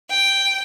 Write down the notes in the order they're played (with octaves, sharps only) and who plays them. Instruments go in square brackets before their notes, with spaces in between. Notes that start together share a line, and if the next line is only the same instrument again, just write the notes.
[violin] G5